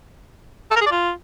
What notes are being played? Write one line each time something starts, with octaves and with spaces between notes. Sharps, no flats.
A4
A#4
G#4
D5
F4